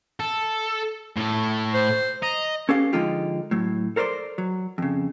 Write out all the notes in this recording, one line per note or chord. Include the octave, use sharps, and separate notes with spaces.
A4
A2 A4
C5
D#5 A#5
C#4 G4 A4 B4 F5
D3 F3 G#3 D#4 F4 G4
A2 F#3
A4 A#4 C5 D5 C6
F#3
F2 C#3